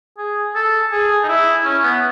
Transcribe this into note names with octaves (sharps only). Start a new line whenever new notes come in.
G#4
A4
G#4
D#4
E4
C#4
B3